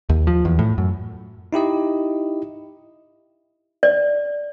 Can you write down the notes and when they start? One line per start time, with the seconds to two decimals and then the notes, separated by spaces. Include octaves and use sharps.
0.09 D#2
0.27 F3
0.45 E2
0.59 A2
0.78 F#2
1.53 D#4 E4 G4 D#5
3.83 D5